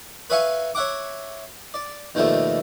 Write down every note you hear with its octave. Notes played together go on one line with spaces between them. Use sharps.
B4 C#5 E5 F5 G#5 C#6
C#5 E5 F#5 D6
D5
D#2 B2 F3 G3 A3